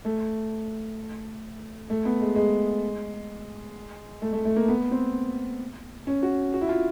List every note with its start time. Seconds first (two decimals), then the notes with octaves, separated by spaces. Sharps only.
0.05 A3
1.90 A3
2.05 B3
2.21 G#3
2.36 G#3
4.22 A3
4.33 A3
4.45 A3
4.56 A#3
4.68 B3
4.91 C4
6.07 C#4
6.23 F#4
6.54 F#4
6.61 E4
6.69 F4